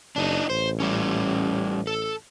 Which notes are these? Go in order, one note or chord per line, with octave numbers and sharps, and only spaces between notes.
F#1 D4 D#4
A1 C5
G3 C#4
A4